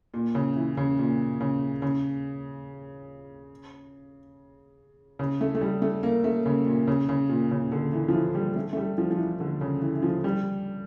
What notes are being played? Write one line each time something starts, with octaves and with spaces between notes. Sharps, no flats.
A#2
C#3
E3
C#3
A#2
C#3
C#3
C#3
A3
A3
G3
A3
A#3
A3
C#3
A#2
C#3
C#3
A#2
C#3
D3
E3
F3
E3
G3
A3
A3
G3
F3
F3
E3
D3
C#3
E3
E3
F3
G3